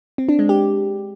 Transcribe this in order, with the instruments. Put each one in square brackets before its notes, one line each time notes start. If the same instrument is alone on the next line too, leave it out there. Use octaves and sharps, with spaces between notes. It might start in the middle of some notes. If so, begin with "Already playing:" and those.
[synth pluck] C4
D4
G#3
G4